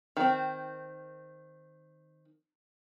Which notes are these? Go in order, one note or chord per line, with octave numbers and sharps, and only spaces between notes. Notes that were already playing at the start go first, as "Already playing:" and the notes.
D#3 C4